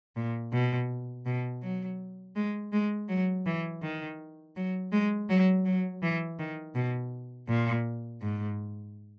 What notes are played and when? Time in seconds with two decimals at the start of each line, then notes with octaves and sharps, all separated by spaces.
0.16 A#2
0.53 B2
1.26 B2
1.63 F#3
2.36 G#3
2.72 G#3
3.09 F#3
3.46 E3
3.83 D#3
4.56 F#3
4.92 G#3
5.29 F#3
5.65 F#3
6.02 E3
6.39 D#3
6.75 B2
7.48 A#2
8.22 G#2